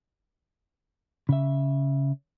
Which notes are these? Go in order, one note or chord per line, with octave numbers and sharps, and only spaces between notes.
C#3 E5